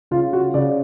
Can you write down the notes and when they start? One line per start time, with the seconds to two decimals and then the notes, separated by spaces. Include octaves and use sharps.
0.11 C#3 F4
0.33 F#4
0.54 C#3 D5